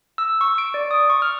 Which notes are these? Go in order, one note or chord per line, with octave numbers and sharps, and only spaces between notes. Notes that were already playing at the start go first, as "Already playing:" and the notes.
E6
C#6
D7
D5
D#6
C#6
F6